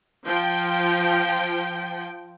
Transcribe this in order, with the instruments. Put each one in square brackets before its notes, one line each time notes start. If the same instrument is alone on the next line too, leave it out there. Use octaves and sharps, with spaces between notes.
[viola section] F3 G5